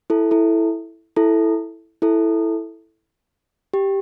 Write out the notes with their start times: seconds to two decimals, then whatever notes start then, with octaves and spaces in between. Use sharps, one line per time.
0.10 E4 A4
0.31 E4 A4
1.16 E4 A4
2.02 E4 A4
3.74 G4